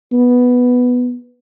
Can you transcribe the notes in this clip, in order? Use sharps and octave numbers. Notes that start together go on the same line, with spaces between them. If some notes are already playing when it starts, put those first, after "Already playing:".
B3